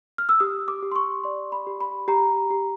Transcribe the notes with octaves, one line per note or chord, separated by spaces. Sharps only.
F6
E6
G4 D#6
D6
G4
C6
C#6
D5 C6
B5
G4
B5
G4 A#5
G4